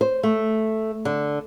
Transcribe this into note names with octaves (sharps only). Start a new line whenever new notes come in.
C5
A3
D3